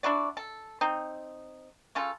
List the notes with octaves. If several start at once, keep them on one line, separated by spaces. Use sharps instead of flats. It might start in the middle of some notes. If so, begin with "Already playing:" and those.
D4 E4 F#4 D5
A4
C4 D#4
C#3 C#4 F4 A4